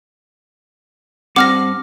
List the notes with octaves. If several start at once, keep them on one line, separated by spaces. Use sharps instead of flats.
G2 C4 F#5 D6 F6 A#6